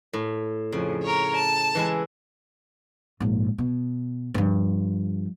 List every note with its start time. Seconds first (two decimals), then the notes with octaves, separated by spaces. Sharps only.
0.13 A2
0.72 F2 C#3
1.03 A#4 C#5
1.35 A5
1.75 E3 G#3 E4
3.20 A#1 G#2
3.58 B2
4.34 G2 F3